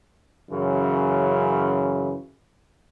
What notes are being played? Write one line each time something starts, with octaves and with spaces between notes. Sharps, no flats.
F#2 C#3 E3